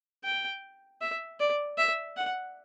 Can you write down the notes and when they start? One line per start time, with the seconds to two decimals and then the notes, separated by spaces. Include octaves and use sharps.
0.24 G5
1.01 E5
1.40 D5
1.78 E5
2.17 F#5